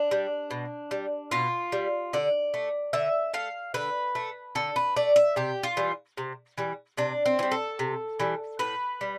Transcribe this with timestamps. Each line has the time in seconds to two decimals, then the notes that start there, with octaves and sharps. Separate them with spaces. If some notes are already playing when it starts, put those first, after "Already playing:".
Already playing: D4
0.11 G3
0.51 B2
0.91 G3
1.31 B2 F4
1.72 G3
2.13 D3 D5
2.54 A3
2.93 D3 E5
3.34 A3 F5
3.74 D3 B4
4.15 A3
4.55 D3 A4
4.76 B4
4.96 A3 D5
5.16 E5
5.36 C3 G4
5.63 F4
5.77 E3 G3
6.17 C3
6.58 E3 G3
6.97 C3 D4
7.26 C4
7.39 E3
7.43 G3
7.51 A4
7.79 C3
8.20 E3 G3
8.59 A2 B4
9.01 G3